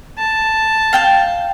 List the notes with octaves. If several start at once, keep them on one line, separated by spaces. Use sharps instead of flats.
A5
F5 G5 G6